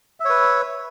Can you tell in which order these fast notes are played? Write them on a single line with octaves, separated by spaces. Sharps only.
E5 C#5 B4